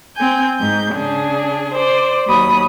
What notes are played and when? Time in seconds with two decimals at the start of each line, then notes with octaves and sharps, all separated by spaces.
0.15 C4 G#5 G6
0.59 G#2 G6
0.93 C#3 D4 G#4
1.73 C5 D5
2.27 D#2 F#3 B5 D#6